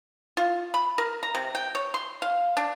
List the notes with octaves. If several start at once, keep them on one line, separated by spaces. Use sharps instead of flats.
F4
B5
A#4
A#5
C3
G5
C#5
C6
F5
D4